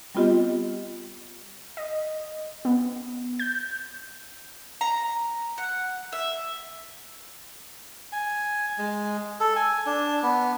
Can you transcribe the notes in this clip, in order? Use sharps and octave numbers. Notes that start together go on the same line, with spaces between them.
G3 B3 C4 F4 G4 D#5
D#5
B3
G6
A#5
F#5
E5
G#5
G#3
A4
G#5
D4
B3